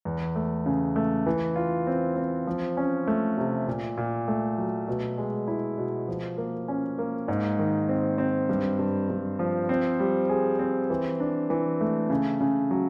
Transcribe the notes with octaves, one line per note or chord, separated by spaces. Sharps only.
E2
A3
C#3
A3
E3
F4
C4
C4
F3
C#4
A3
C3
A#2
A#2
A3
F#3
B2
G#3
E4
B2
F3
A#3
C#4
A#3
G#2
D#3
C4
C4
G2
G2
G2
F3
C4
G3
G#4
C4
E3
D4
E3
A3
C#3
C#3
F#3